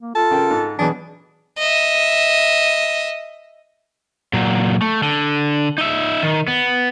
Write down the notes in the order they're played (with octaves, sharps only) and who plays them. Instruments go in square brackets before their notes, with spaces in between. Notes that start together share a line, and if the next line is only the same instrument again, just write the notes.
[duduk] A#3
[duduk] F4 [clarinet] A4 [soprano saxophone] A5
[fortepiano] C#3 A#4 G5
G#2
[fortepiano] B2 G#4 [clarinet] E3 [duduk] F#3 [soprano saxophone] D4
[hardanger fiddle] D#5 E5
[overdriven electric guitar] A#2 F#3
A3
D3
D#4 E5
D#3
B3